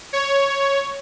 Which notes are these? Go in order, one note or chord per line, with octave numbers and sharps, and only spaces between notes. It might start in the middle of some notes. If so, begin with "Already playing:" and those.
C#5